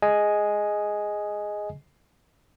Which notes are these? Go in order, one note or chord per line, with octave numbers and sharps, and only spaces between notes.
G#4 D#5 G#5